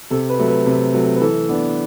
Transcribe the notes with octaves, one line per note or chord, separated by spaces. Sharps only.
C3 A4
B4
F#3 A3
B4
C3
F#3 A3
B4
E3 A4
B3 D4